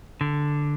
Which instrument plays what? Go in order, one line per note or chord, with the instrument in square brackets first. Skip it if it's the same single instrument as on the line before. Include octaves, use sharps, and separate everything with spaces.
[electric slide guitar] D3